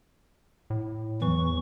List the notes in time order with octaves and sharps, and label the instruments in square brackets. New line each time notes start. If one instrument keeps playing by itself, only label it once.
[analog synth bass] A2
[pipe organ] E2 F#3 C#6 [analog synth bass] E3